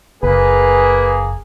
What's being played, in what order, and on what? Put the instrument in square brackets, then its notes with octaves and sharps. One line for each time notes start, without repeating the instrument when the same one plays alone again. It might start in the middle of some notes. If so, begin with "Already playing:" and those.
[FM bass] F#1 [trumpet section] A#3 G#4 [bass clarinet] B4